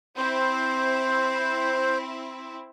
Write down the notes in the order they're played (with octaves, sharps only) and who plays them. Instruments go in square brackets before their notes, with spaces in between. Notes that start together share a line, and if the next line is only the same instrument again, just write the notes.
[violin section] C4 E4 [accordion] C5